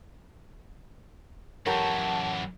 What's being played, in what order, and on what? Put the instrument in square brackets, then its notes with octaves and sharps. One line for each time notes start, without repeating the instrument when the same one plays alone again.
[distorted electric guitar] F#2 E3 [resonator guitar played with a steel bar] G4 A#4 C#5 [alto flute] F#5 [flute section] A5